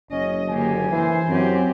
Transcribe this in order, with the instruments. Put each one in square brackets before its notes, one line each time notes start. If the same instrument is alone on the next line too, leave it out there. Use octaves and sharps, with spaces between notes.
[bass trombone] F#1 [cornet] C#4 [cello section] D#5
[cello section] D3 A#3 G4 [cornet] G#5
[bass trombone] E3 [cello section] C5
[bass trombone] F#2 [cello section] C4 G4